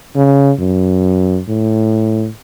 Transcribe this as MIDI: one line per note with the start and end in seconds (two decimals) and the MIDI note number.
0.16 0.52 49
0.59 1.40 42
1.48 2.28 45